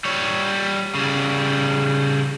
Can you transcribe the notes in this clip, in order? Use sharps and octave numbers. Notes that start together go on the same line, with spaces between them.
G3 C#5
C#3 G3